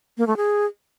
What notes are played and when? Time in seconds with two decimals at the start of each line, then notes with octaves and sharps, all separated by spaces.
0.18 A#3
0.27 A3
0.37 G#4